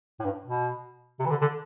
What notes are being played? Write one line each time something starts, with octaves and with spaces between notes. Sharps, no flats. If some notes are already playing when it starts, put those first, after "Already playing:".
A2
G2
B2
C3
E3
D3
D3